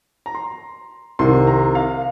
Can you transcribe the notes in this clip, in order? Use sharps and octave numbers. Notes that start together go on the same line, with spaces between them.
A#5
C6
C2 C3 D#3 C6
A#5
F5